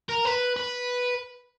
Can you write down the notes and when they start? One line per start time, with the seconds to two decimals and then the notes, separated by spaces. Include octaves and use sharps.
0.09 A#4
0.25 B4
0.56 B4